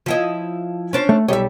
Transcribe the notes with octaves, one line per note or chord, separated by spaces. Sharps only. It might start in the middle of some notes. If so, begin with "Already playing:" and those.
F3 E4 D#5
C#4 D4 C5
A3
B1 G3 C#5 D#5 E5